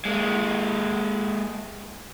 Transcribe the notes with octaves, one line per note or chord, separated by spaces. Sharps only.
G#3 A#3